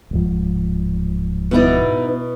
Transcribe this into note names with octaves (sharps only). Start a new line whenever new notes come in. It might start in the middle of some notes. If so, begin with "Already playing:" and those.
D1 G#2 F3
B2 B3 D#4 E4 D5